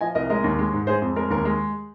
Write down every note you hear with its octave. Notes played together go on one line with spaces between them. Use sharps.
F3 D#5 G#5
C2 A#4 D#5
G#3 A#4 D#5
D#2
G#3
G#2
G#3 G#4 C5
F2
G#3 A#4
D#2 A#4
G#3